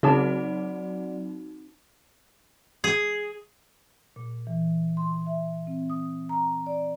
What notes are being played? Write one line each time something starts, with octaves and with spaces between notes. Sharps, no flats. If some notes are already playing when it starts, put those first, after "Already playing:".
C#3 F#3 C4 D#4 F#4 G#4 D5 A5
G#4
A#2
E3
C6
E5
C4
D#6
A#5
D5